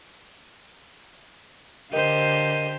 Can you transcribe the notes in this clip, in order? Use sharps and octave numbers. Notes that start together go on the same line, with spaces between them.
D3 G4 A#4 C5 D#5 F5 D#7